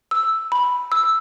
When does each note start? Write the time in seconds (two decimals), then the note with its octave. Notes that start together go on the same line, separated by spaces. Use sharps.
0.11 E6
0.52 B5
0.92 E6